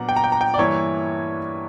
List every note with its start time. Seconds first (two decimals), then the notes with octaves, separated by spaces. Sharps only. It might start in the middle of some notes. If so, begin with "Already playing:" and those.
Already playing: A#2 F#3 B3 D4 F#5 A#5
0.09 G5
0.16 A#5
0.24 G5
0.32 A#5
0.41 G5
0.54 D5
0.58 G2 E3 A#3 E4 C#5